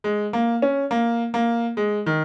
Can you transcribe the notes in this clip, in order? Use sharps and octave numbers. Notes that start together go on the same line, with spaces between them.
G#3
A#3
C#4
A#3
A#3
G#3
D#3